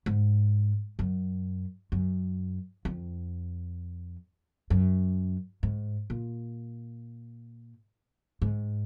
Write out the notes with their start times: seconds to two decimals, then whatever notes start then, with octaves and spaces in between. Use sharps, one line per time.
0.06 G#2
0.99 F#2
1.92 F#2
2.85 F2
4.70 F#2
5.63 G#2
6.10 A#2
8.42 G#2